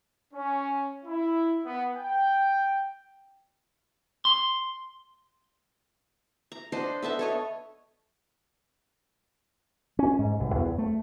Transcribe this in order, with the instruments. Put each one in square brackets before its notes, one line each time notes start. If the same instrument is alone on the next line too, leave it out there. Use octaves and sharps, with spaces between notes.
[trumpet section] C#4
E4
B3
G5
[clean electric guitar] C6
[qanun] A#5
D4 C5 D#5 F#5
B3 A4 E5 A5
A4 C#5 D#5
[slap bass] C#4
G#2
C2
E2
A3